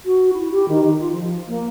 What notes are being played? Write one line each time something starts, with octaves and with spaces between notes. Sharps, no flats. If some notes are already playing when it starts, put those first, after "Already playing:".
F#4
E4
G4
D#3
D#4
F4
F3
A#3